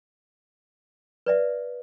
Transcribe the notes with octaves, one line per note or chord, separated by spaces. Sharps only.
B4 D5 E5